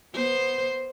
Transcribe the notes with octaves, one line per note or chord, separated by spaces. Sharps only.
B3 C5